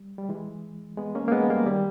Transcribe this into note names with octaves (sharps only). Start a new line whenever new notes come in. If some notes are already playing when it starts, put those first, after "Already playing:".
Already playing: G3
G3
E3 G#3
G#3 B3
A#3 C#4
A#3
G#3 B3
G3 A#3
D#3 G3